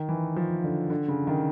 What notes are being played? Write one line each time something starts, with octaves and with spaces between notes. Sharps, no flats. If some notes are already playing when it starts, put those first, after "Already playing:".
Already playing: D#3
E3
F3
D3
D3
C#3
D#3